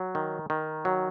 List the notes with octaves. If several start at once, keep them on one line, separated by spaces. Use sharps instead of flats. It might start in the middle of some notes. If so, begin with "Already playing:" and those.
Already playing: F#3
D#3
D#3
F#3